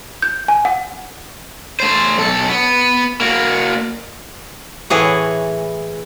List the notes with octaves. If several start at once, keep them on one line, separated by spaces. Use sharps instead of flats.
G6
G#5
F#5
A3 C5
B1 A4
B3
A#3 F#4
A2 E3 G#4 C#5 F#5